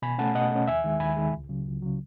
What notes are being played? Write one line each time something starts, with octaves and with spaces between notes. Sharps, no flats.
B2 G#5 B5
A3 C#4 F#5 A5
B2 D#5 F#5
A3 C#4
D#2 E5 G#5
D#3 G#3
D#2 G#5 B5
D#3 G#3
C#2
C#3 F#3
C#2
C#3 F#3